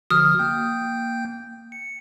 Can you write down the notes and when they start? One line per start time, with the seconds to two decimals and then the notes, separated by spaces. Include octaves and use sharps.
0.10 D3 F3 F#4 D#6 F6
0.39 A#3 G5 G6
1.72 C#7